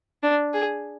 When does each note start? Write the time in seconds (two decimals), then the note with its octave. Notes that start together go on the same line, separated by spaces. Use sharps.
0.23 D4
0.54 G#4